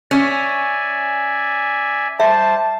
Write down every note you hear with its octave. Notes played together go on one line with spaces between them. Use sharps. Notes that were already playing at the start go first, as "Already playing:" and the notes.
C#4 D5 E5 G#5
G3 C5 E5 A5